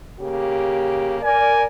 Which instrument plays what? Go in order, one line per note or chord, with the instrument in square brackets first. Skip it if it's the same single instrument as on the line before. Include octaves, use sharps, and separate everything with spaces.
[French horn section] C#3 A#3 G4
[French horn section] A#4 D5 [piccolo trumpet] G#5